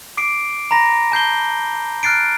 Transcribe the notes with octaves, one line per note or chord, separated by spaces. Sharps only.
D6 C7 D7
A#5 B5 A#6
A5 G6 C7 G7
F6 F#6 A6 C7 D7